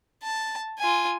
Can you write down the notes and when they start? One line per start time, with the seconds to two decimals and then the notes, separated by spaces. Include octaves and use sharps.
0.23 A5
0.79 F4 G#5